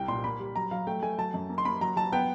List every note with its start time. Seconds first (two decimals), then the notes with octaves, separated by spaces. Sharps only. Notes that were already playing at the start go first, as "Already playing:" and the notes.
Already playing: C2 G5
0.08 A#2 C6
0.24 A#3 B5
0.40 G3
0.56 F#3 A#5
0.71 F#3 F5
0.87 A3 G5
1.03 A3 G#5
1.18 F#3 A5
1.34 F#2
1.50 A#3
1.58 C6
1.65 A#3 B5
1.81 F#3 A#5
1.96 F#3 A5
2.12 B3 G5